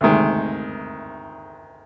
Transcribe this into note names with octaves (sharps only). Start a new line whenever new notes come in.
D2 C3 D#3 G#3